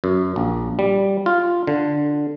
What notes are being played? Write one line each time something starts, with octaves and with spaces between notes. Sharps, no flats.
F#2
A#1
G3
F4
D3